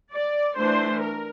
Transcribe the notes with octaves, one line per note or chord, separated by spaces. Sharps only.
D5
E3 A3 D4 C5
A#4